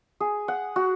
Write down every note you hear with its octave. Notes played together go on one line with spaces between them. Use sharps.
G#4
F#5
F#4